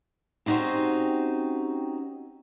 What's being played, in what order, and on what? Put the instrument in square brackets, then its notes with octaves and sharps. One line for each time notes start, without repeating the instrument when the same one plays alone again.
[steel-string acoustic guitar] C4 C#4 D#4 F#4 G4 C5